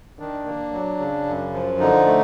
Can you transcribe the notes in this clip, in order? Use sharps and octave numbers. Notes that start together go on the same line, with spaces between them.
D#3 D4
A#3
F#3
C#3
F#2
F3
D3 D#4
A3